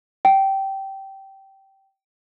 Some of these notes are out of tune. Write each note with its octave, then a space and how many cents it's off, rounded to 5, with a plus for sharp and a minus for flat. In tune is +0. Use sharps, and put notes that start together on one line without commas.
G5 -15